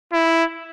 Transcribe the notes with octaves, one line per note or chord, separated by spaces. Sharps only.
E4